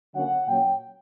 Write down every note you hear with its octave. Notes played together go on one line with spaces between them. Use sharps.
D3 F#3 A#3 C#4 F#5
A#2 F#3 C#4 G5